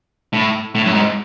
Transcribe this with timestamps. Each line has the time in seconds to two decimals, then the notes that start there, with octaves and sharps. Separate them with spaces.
0.33 A2
0.75 A2
0.86 F#2
0.94 G#2